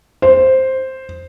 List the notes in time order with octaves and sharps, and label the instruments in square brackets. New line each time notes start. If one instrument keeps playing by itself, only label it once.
[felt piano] C5